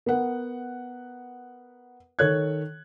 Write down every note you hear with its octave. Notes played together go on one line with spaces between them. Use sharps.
B3 A#4 F#5
D#3 A4 C#5 F#6 G#6